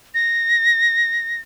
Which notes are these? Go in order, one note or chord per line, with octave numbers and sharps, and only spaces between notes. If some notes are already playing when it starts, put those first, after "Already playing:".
A#6